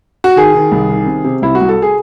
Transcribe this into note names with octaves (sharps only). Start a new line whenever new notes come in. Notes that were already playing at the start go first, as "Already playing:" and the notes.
F#4
D#3 G#4
D#3
C2
D#3
C3
C3
C2 E4
F#4
C2
A4
G#4